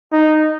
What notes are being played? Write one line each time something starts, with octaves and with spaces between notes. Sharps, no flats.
D#4